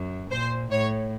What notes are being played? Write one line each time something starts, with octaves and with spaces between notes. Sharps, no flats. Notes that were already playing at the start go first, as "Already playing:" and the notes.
Already playing: F#2
A#2 C5
A2 C#5